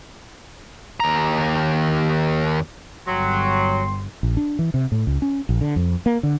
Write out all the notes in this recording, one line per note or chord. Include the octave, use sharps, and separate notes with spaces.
D#2 A#5
G1 F#3 G5 C6
A#1
D4
E3
C3
A2
C#2
C#4
A#1
D3
F2
A#3
D3